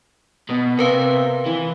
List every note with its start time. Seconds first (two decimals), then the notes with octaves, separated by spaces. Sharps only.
0.49 B2
0.79 C3 A#4 B4 F5
1.46 E3